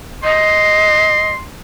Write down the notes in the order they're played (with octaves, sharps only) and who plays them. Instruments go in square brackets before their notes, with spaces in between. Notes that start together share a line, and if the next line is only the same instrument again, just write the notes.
[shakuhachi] D#5 [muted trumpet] C6